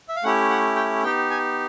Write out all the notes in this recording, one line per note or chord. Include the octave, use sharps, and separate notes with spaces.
E5
F5
A3 C#4 E4 G4 F#5
F#5
G5
B3 D#4 G4 G5
G#5